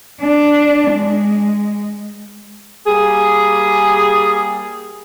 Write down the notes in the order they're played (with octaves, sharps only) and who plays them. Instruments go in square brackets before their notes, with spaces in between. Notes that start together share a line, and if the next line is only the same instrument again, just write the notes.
[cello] D4
G#3
[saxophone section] G3 A#3 G#4